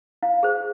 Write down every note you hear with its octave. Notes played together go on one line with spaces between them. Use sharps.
E4 F5
G#4 C5